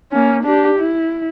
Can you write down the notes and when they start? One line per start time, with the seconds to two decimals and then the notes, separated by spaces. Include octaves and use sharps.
0.12 A#3 C#4
0.44 D4 G4
0.80 E4